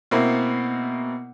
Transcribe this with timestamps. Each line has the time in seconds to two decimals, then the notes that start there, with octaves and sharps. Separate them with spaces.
0.11 B2 A#3 C4 E4